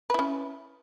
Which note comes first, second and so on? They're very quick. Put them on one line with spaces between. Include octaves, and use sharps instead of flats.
B4 E4 C#4